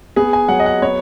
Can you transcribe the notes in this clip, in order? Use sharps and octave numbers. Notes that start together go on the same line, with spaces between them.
B3 G#4
G#5
F#3 F#5
D#5
F#5
B3 C#5